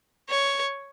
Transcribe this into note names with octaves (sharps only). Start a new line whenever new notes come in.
C#5